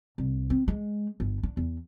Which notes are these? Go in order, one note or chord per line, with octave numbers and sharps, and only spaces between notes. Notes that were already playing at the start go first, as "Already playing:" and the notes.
C2
C4
G#3
G1
D4
E2